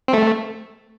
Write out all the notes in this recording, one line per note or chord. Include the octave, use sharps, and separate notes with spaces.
C4
A3